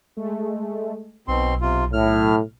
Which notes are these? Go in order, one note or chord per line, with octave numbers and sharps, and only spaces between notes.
G#3 A3
B1 B2 C4 C6
C3 F4
A2 F6